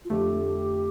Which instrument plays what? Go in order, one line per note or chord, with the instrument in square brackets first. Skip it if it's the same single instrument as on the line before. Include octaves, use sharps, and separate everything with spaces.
[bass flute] F4
[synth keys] F2 D3 A3 [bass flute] G4